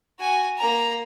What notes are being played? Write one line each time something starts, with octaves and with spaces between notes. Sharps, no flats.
F#4 G#5
A#3 A#5